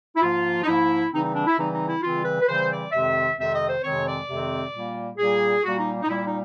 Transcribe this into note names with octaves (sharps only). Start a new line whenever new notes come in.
E4
G#2 F3 A#3 F4
D#4
G#2 F3 A#3 E4
C#3 E3 G3 C4 D#4
D#4
D4
E4
C#3 E3 G3 C4 D#4
D#4
E4
C#3 E3 G3 C4 F4
B4
B4
C#3 E3 G3 C4 C5
D5
F2 C3 D#3 G#3 C4 E5
F2 C3 D#3 G#3 C4 E5
D#5
C5
F2 C3 D#3 G#3 C4 C#5
D5
F2 C3 D#3 G#3 C4
A#2 G3 A#3
A#2 G3 A#3 G#4
A#2 G3 A#3 F#4
D#4
D#4
A#2 G3 A#3 E4
D#4